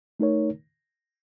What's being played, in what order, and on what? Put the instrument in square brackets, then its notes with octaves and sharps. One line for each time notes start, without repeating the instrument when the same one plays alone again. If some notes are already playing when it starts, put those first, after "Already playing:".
[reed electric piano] A3 D#4 A#4 C#5